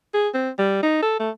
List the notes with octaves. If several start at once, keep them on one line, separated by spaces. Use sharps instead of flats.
G#4
C4
G3
D#4
A4
A3